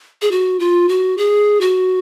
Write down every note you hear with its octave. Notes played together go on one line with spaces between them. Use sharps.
G#4
F#4
F4
F#4
G#4
F#4